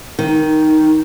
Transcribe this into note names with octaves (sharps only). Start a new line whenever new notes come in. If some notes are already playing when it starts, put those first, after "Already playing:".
D#3